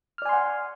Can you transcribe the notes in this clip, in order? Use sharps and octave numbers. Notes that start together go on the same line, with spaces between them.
D5 F#5 G#5 C6 F6